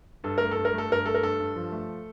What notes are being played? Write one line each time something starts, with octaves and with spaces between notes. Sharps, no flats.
G2 A4
A3 A#4
A4
G2
A#4
A3 A4
G2 A#4
A3 A4
A#4
G2 A4
G2
F3
A3